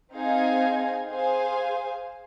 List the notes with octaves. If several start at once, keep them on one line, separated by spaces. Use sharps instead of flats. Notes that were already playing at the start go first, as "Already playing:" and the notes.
C4 D#4 G#4 F5 G#5
G#4 C5 F5 G#5